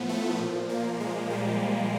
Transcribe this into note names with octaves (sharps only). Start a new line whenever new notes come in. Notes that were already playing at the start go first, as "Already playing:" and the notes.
Already playing: A2 F3 B3
A3
A#2 F3
A#3
G#3
G3